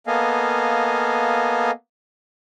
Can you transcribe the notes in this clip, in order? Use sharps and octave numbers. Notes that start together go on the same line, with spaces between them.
A#3 B3 A4 D#5 F5 G#5